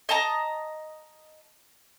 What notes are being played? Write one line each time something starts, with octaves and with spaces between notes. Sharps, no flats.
D#5 A5 A#5